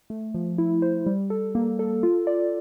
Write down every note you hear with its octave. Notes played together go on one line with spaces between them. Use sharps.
A3
F3
E4
C5
G3
A4
A#3
A4
F4
D5